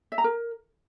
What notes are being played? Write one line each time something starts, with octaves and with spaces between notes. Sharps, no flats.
E5
A#5
A#4